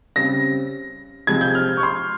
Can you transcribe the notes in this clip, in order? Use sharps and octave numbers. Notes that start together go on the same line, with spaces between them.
C#3 G3 C4 A#6
C3 F3 G#3 C4 G#6
G6
F6
C#6
C6